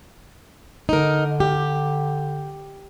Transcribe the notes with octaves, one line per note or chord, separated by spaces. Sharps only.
D3 D#4 A#4
G4